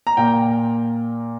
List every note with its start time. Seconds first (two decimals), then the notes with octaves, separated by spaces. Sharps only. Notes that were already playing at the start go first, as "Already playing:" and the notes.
0.07 A#5
0.17 A#2 A#3 G5